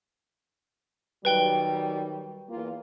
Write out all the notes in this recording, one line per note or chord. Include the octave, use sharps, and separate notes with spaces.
D#3 F#3 G3 B4 G5 G7
E2 A#3 F4